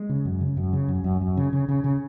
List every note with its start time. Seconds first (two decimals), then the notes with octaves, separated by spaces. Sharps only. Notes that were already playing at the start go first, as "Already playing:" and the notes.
Already playing: G#3
0.09 C#3
0.25 F#2
0.41 C#3
0.57 F#2
0.73 C#3
0.89 F#2
1.04 F#2
1.21 F#2
1.37 C#3
1.53 C#3
1.69 C#3
1.84 C#3